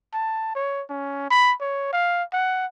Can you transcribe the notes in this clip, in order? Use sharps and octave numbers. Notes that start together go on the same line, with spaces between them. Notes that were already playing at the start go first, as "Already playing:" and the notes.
A5
C#5
C#4
B5
C#5
F5
F#5